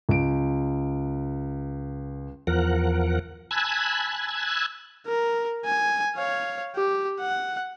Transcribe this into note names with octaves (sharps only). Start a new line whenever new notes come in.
C#2 D7
E2 F3 A#4 F#5
G#5 A5 B5 E6 F#6 G#6
A#4
G#5
C#5 F5
G4
F#5